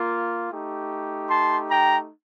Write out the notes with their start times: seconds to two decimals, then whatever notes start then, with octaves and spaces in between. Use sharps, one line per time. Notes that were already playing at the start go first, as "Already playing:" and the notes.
Already playing: A#3 F4
0.50 A3 D#4 G4
1.30 A5 C6
1.70 G5 A#5